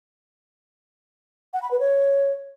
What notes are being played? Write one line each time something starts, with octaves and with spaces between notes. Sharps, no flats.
F#5
B5
B4
C#5